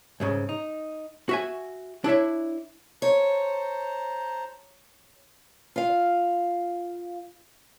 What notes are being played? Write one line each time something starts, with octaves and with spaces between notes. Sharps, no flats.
C2 G#2 C#3
D#4
F#4 E5 G#5
D4 E4 C#5 E5
C5 C#5 A5 A#5
F4 F5